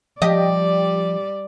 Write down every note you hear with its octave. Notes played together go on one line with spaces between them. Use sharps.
F3 G3 G4 D5 D#5